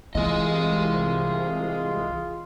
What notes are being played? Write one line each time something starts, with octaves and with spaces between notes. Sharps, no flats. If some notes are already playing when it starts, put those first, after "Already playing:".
C2 E3 F4 G#4 D#5